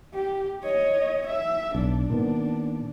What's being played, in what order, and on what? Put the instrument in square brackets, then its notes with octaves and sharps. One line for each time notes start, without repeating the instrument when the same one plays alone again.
[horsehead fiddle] G4
C#5 D#5
E5
[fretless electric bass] B1 [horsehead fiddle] D4
[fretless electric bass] A#2 D#3 B3